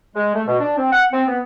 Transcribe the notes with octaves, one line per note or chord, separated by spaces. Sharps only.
G#3
A3
B2
D4
C4
F#5
C4
B3